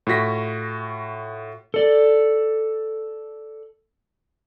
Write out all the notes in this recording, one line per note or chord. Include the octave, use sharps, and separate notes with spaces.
A2 F4 F#4 A#6 B6
A4 D5